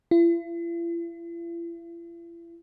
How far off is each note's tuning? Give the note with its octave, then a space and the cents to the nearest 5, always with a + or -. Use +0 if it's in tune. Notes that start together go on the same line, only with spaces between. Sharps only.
E4 +45